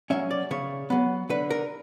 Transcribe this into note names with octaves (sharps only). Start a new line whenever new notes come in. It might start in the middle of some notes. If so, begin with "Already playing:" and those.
F#3 A#3 C#4 E5
D5
C#3 C#5
F#3 B3
D3 B4
A#4